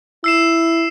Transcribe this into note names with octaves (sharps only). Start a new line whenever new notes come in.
E4 E6 C7 E7